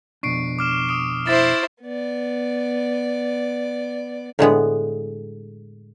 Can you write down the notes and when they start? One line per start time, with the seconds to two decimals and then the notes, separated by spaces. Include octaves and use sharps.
0.23 F2 B2 D4 C#6 C7 D7
0.59 D6 F6 E7
0.89 D#6 D7
1.27 E4 C5 A6
1.83 B3 D5
4.39 A2 D3 G#3 B3